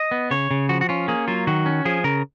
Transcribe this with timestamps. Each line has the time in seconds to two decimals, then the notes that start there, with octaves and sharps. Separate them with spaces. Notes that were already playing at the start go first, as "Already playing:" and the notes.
Already playing: D#5
0.11 B3
0.31 C#3 C#5
0.51 C#3
0.69 F3 F#4
0.81 F#4
0.89 C#4 F4
1.08 A#3 G#4
1.28 F#3 F4
1.47 D#3 F#4
1.66 C#4
1.85 F3 G#4
2.04 C#3 A#4